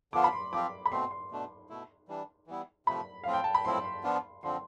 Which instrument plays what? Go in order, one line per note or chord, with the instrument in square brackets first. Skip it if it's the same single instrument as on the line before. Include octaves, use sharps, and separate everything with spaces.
[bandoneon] D3 F3 B3 D4 F4 [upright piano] D6
[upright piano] B5
C6
[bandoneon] F3 C4 F4 [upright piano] D6
[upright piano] B5
[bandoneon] B2 A3 C4 [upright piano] C6
[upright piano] C6
[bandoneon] B2 A3 D4
B2 A3 E4
E3 G3 D4
E3 G3 B3 E4
[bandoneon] C3 F3 A3 [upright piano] B5
[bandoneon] A2 F3 C4 F4 [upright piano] F5
[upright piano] G5
A5
B5
[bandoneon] A2 F3 C4 E4 [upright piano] C6
[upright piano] C6
[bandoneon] F3 B3 D4 F4
[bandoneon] D3 F3 C4 [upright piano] C6